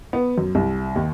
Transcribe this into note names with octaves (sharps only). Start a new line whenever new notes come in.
B3
F#2
C2
D#2